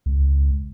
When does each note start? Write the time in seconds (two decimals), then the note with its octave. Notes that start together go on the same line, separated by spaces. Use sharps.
0.06 C#2